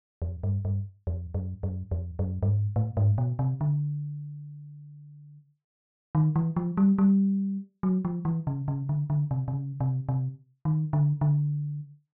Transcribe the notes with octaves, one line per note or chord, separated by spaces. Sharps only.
F2
G2
G2
F2
F#2
F#2
F2
F#2
G2
G#2
A2
G#2
B2
C3
D3
D#3
E3
F3
G3
G3
F#3
F3
E3
C#3
C#3
D3
D3
C3
C3
C#3
C3
C3
D#3
D3
D3